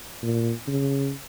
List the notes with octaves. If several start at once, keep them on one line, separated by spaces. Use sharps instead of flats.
A#2
C#3